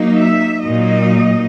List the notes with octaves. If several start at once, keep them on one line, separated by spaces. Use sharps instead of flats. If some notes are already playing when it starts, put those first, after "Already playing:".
Already playing: F#3 A#3 D#4
E5
A#2 F#3 A#3 D#4 D#5